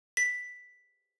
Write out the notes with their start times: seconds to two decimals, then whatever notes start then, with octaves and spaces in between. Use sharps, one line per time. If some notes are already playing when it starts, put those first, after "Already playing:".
0.17 B6